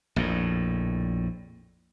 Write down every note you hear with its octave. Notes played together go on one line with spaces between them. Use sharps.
A#1 F2 A2